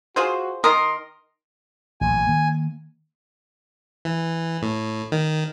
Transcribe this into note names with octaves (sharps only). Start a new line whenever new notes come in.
F4 F#4 G#4 C5
D#3 A#4 C6 D#6
A1 A#2 F#3 G#5
D#3 A#3
E3
A2
D#3